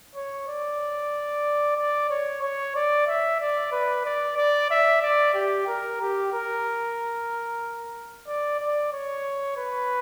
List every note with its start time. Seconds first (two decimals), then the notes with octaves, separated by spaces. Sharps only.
0.16 C#5
0.48 D5
1.77 D5
2.10 C#5
2.42 C#5
2.75 D5
3.07 E5
3.40 D5
3.72 B4
4.05 D5
4.37 D5
4.71 E5
5.02 D5
5.34 G4
5.67 A#4
6.01 G4
6.33 A#4
8.27 D5
8.60 D5
8.93 C#5
9.57 B4